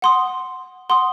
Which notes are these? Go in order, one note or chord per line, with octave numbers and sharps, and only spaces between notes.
F#5 C6 D#6
F#5 C6 D#6